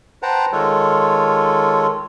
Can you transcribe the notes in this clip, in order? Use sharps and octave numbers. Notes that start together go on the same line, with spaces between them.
B4 C5 F#5 G5 A5 A#5
D#3 G#3 F4 A4 C#5